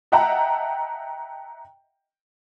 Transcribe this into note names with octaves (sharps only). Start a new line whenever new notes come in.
D#5 E5 F#5 G5 A5 A#5